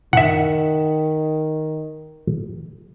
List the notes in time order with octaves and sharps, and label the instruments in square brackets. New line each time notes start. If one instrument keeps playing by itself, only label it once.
[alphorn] D#3 [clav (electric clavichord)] E5 F#5